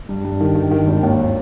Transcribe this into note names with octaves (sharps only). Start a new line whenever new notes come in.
G2
G2
D#3
D#3
D#3
G#1
D#2